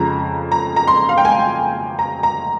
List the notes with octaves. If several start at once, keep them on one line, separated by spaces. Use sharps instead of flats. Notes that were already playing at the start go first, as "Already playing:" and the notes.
Already playing: F2 C#3 F3 G#3 A#5
A#5
A#5
C6
F5
G5
G#5
A#5
A#5